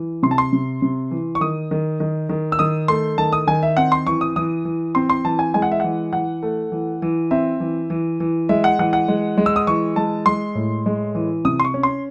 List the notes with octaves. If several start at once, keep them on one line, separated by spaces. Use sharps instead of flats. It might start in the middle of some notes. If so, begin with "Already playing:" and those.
Already playing: E3
C3 C6
A5
C6
C3
C3
E3
C#6
D#3 D#6
D#3
D#3
D#3
E6
D#3 D#6
A3 C6
D#3 A5
D#6
D#3 G#5
E5
C4 F#5
C6
E3 C#6
D#6
E3 D#6
E3
C4 C6
C6
E3 A5
G#5
G#3 G#5
F#5
E5
E3 F#5
E3 F#5
A3
E3
E3
C4 E5
E3
E3
E3
G#3 E5
F#5
E3 F#5
F#5
G#3
G#3
E6
D#6
E3 C#6
G#3 A5
G#3 C6
A2
G#3
E3
C3 D#6
C6
C#6
C#4
C6